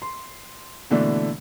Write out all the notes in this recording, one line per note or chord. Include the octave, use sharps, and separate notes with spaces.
C6
B2 D3 E3 A3 A#3 D4